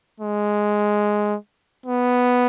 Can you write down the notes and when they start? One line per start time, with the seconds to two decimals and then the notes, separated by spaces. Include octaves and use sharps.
0.20 G#3
1.86 B3